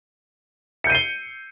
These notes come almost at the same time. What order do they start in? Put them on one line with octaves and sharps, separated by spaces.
C#7 G6 D#7 C7 G7